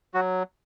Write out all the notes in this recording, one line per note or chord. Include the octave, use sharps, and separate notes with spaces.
F#3 F#4